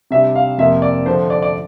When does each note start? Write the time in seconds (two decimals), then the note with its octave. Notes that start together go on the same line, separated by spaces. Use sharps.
0.11 C3 G3 D4 E5
0.35 F5
0.58 F2 C3 F3 A#3 E5
0.82 D5
1.06 D3 F3 A3 D4 C5
1.30 D5
1.42 D5